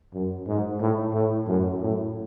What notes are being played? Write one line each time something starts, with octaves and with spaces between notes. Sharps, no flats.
F#2
G#2
A2
A2
F#2
A2